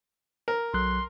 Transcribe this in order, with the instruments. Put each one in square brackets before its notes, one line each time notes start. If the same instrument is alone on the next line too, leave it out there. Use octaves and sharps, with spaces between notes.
[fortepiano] A#4
[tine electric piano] B1 F#3 F#6 [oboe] C6